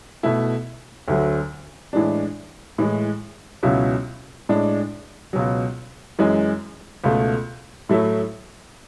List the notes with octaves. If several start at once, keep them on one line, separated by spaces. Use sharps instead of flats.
B2 A3 E4
D2 D3 F#3
A2 E3 G#3 D4
A2 E3 G#3
C#2 B2 F#3 C#4 E4
A2 G#3 D4
C#2 B2 F#3
F#2 E3 G#3
C#2 B2 A3
A2 F#3 A3 E4